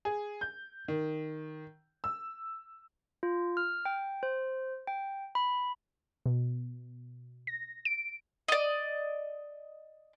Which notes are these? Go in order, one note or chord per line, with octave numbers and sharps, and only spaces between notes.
G#4
G6
D#3
E6
F4
F6
G5
C5
G5
B5
B2
A#6
D7
D5 D#5